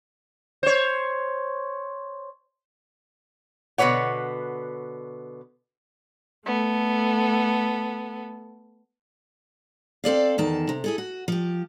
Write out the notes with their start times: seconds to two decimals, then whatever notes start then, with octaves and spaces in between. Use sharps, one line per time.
0.63 C5 C#5
3.78 B2 D3 B4 C#5 F#5
6.45 A3 B3 A4
10.04 C4 A4 D5 F5
10.38 E2 D#3 A5
10.69 C3
10.84 E4 G#4 A4
10.98 F#4
11.28 F3 G4